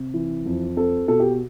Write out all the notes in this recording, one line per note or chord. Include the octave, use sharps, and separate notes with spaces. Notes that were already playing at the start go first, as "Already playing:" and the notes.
Already playing: C3
E3
F2
C4 A4
B2 A4
G4